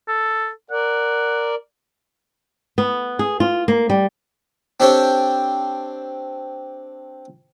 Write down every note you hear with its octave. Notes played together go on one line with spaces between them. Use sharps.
A4
A#4 D5 F#5
B3
G#4
F4
A#3
G3
C4 D4 G4 A4 C5 C#5